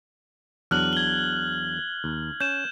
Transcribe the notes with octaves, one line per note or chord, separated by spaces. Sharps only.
E2 F#3 D4 F6 F#6 F#7
G#6 G7
D#2
C#4 G6 E7